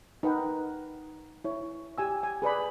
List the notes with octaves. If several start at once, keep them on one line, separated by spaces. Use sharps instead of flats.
D#4 A#4 B4 F#5 G5
E4 C#5
G4 G#5 E6
G#5
G#4 B4 D5 B5